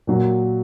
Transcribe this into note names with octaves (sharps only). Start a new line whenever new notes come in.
A#2 F#3 A#3